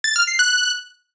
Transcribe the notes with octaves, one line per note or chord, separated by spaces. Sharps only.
A6
F6
C7
F#6